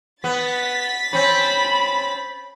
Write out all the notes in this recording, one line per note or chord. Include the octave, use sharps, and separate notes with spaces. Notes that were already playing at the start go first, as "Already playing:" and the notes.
B3 A6 B6
C4 C#4 B5